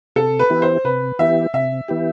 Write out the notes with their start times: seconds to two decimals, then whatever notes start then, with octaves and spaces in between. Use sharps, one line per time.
0.16 C3 A4
0.39 B4
0.50 E3 B3 E4 G4
0.62 C5
0.84 C3 B4
1.19 E3 B3 E4 G4 E5
1.53 C3 E5
1.88 E3 B3 E4 G4